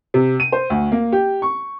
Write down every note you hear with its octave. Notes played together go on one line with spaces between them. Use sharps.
C3
D#7
C5
D2
A#3
G4
C#6